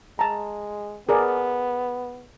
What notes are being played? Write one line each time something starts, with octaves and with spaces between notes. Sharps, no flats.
G#3 A5 A#5
B3 G#4 A#4 D5